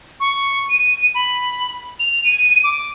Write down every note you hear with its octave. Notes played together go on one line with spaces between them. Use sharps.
C#6
D#7
B5
F7
D#7
D6